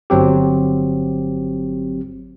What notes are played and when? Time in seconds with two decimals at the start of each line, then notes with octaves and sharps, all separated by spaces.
0.10 G1 F#3 C4 G4